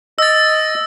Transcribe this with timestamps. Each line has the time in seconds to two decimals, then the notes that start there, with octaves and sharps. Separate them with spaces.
0.18 D#5 E6 A6